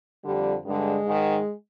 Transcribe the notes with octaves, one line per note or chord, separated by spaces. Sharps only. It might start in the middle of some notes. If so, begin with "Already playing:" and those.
F2 D3 G3
G2 D3 G#3
G#2 D#3